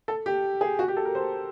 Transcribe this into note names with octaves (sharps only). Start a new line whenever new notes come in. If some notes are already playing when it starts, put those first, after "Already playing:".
A4
G4
G#4
F#4
G4
A4
A#4
C5